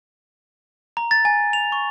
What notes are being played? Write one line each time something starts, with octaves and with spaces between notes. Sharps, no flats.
A#5
A6
G#5
F7
C#6